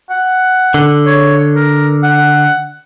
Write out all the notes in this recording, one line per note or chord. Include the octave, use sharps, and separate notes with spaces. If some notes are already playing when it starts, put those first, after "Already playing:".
F#5
D3
C#5
A#4
F#5